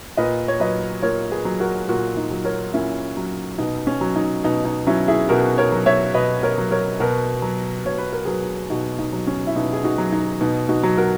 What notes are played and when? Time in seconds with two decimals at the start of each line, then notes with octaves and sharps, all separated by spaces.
0.17 A#2 B4 D#5
0.48 C#5
0.60 F#3 B4 D#5
1.02 A#2 A#4 C#5
1.31 G#4 B4
1.45 F#3
1.60 F#4 A#4
1.88 A#2 F#4 A#4
2.17 D#4
2.31 F#3
2.45 A#4 C#5
2.73 A#2 C#4 E4
3.17 F#3
3.58 B2 D#4
3.87 C#4
4.01 F#3
4.16 D#4
4.44 B2 D#4
4.65 D#4
4.87 F#3 C#4 E4
5.08 E4 G#4
5.29 B2 F#4 A#4
5.58 A#4 C#5
5.72 F#3
5.86 C#5 E5
6.14 B2 B4 D#5
6.43 A#4 C#5
6.58 F#3
6.71 A#4 C#5
7.00 B2 F#4 A#4
7.42 F#3
7.85 B2 C#5
7.98 B4
8.12 A#4
8.25 F#3 G#4 B4
8.70 B2 D#4 F#4
8.99 D#4
9.13 F#3
9.27 C#4
9.47 E4
9.56 B2 D#4
9.73 G#4
9.84 D#4 F#4
9.98 F#3
10.12 D#4
10.41 B2 D#4
10.69 D#4 F#4
10.83 F#3
10.97 F#4 A#4